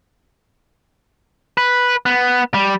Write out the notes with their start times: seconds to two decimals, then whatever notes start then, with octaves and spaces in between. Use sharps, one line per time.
1.58 B4
2.06 B3
2.54 G3